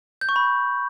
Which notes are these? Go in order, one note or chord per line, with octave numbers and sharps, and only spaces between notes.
G6
C#6
B5